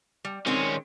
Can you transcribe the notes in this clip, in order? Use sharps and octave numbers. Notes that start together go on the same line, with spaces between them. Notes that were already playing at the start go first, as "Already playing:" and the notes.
G3
D#3 G#3 C4 C#4 C#5